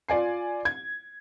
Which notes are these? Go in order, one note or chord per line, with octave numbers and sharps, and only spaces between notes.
F4 D5 G#5 C7
G#6